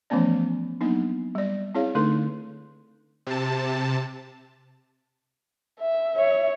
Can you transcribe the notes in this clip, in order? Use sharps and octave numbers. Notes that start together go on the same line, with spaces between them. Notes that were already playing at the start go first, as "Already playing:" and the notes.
E3 F3 A3 B3 C#4 D5
F#3 A#3 B3 D4 D#4
G3 D5
C4 E4 G#4 C#5 F5
D3 A3 D4 D#4 A4 C6
C3 A5
E5
C#5